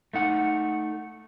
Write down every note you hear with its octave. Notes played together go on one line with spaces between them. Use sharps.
A3 D#4 F#5